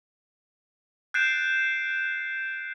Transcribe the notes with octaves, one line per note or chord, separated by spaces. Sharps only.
F#6 G6 A6 C7 D7 E7